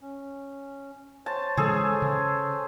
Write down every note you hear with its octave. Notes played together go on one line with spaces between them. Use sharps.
C#4
C5 C#5 G#5 A5
C#3 E3 G#3 G#4 A4
C#3